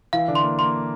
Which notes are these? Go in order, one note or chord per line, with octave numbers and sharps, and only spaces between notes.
E3 E4 F5
D3 D4
C6
A#3
A#3 C6